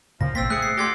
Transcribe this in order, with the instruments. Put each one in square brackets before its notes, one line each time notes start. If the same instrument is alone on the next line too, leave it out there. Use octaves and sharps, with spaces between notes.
[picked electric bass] D2 A#2 C#3 [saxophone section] F3 [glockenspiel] A#6
[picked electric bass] A1 A#3 [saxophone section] C4 [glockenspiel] E6 A6 B6
[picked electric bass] A3 [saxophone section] C4 G#4 [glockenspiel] F#6 C#7
[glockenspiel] C7
[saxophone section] F2 D3 G4 [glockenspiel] C6 G#6 A#6